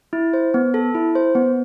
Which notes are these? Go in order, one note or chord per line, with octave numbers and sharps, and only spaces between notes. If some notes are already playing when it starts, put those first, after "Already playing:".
E4
C5
B3
A4
E4
C5
B3